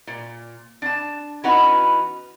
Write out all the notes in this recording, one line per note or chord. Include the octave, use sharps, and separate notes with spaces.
A#2
D4 A5
E3 B3 C#4 D#4 F#4 B4